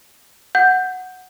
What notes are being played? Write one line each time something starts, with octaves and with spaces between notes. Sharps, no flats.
F#5 G6